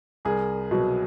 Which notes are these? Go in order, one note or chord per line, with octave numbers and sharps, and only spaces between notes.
C2 G#4 A#4
B2 F#3